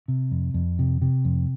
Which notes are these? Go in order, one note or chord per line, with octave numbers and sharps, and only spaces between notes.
C3
F2
F2
C3
C3
F2